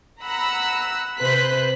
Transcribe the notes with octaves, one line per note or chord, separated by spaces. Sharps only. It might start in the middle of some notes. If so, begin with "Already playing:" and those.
F#5 A#5 B5 E6 F#6
C3 B4 C5 F#6 B6